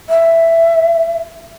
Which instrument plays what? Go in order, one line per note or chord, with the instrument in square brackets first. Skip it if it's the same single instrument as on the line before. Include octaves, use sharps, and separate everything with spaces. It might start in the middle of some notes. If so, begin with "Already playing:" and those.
[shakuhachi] E5